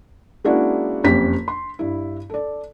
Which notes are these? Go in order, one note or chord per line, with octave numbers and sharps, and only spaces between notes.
G#3 A#3 C#4 D4 E4 F#4
F#1 F2 C#4 G4 B6
C6
G2 E4
A4 D5